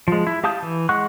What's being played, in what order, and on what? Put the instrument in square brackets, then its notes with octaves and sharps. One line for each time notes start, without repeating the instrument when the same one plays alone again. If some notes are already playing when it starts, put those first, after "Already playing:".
[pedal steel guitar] F3 G#3
E4
G4 F5 A5 D#6 G6
E3
G#3 F#5 C#6 F#6